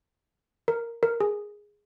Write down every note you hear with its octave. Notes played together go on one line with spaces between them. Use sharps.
A#4
A#4
G#4